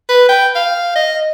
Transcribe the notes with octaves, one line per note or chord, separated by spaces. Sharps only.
B4
G5
F5
D#5